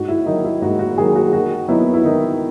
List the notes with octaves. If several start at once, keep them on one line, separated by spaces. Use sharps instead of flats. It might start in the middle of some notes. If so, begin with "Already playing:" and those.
Already playing: G#2 F#4
E4
D#3 F#3 D#4
E4
G#2 F#4
F#4
D#3 F#3 G#4
F#4
D#3 F#4
F#3 B3 D#4 E4
E4
D#3 D#4